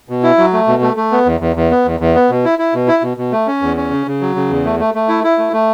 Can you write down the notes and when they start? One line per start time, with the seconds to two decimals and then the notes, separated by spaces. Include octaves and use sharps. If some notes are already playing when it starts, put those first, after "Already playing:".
0.09 B2
0.23 E4
0.38 F#3
0.53 A3
0.67 B2
0.82 A3
0.97 A3
1.12 B3
1.26 E2
1.40 E2
1.56 E2
1.71 B3
1.86 E2
2.00 E2
2.15 B3
2.30 B2
2.45 E4
2.59 E4
2.74 B2
2.88 E4
3.02 B2
3.17 B2
3.32 A3
3.47 C#4
3.62 E2
3.77 C#4
3.91 C#3
4.06 C#3
4.21 F#3
4.36 C#3
4.50 E2
4.65 A3
4.80 A3
4.94 A3
5.09 E4
5.24 E4
5.38 A3
5.53 A3